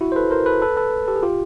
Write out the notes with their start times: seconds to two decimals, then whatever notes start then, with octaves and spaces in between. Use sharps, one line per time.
0.01 E4 F#4
0.12 C5
0.16 A4 B4
0.31 A#4 C5
0.46 A4 B4
0.62 A4 B4
0.77 A4 B4
1.08 G4 A4
1.16 G#4
1.23 F4 G4